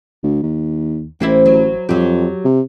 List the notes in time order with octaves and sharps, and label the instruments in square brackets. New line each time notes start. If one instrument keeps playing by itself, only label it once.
[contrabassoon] D2
D#2
[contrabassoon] A1 [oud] A#3 C4 E4
[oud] F#3
[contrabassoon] F2 [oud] F#3 G4
[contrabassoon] C3